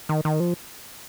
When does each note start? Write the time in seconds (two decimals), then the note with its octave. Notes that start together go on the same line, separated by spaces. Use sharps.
0.09 D#3
0.25 D#3
0.40 F3